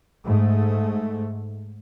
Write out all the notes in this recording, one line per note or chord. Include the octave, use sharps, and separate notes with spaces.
G#2 A3